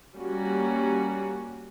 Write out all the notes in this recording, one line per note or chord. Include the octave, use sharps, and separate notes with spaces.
G3 A#3 C#4 F#4